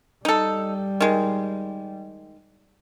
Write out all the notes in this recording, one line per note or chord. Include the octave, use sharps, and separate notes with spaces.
G3 D#4 A4
D#3 G#3